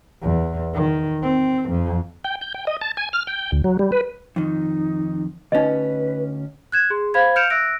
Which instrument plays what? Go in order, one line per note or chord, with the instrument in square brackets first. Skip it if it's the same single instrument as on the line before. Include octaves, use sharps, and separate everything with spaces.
[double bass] E2
D#3
C4
F2
[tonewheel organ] G5
G6
G5
D#5
A5
G#5
F6
G5
D2
F#3
G3
B4
[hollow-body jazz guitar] F2 D#3 [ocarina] D#4
[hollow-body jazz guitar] D2 C#4 [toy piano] D#4 D#5 [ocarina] B4
[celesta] F#6 G#6 E7
G#4 C6
C5 F5 B5 G#6
F6 G6 C#7 D7 E7 F7
E5 E6 F#6 A#6 D7